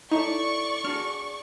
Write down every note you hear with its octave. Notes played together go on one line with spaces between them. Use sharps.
D#4 E4 A4 C#5 D5 C#6
D4 F#4 G#4 F6